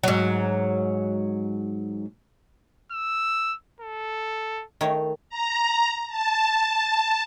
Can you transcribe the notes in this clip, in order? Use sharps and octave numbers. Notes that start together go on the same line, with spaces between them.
G#2 F#3
E6
A4
D#3 A3 C#5
A#5
A5